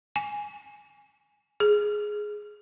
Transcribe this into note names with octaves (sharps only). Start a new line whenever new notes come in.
G#5
G#4